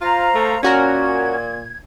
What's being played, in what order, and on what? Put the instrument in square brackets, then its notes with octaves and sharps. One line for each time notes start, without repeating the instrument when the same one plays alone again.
[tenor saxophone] F4 [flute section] C5 F5 A#5
[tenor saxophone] A3
[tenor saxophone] A#2 [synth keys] C#4 F#4 A#4 [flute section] G#6